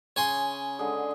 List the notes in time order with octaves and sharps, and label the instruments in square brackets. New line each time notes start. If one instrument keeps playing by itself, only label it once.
[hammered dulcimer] C#3 [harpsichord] C#5 G#5 C6
[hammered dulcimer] D3 G#3 G#4